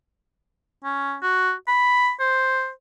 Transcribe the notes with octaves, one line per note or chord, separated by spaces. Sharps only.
C#4
F#4
B5
C5